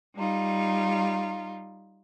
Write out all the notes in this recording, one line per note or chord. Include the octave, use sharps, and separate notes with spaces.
G3 D#4 F4